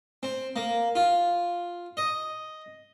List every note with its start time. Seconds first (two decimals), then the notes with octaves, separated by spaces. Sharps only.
0.23 C4
0.56 A#3
0.95 F4
1.97 D#5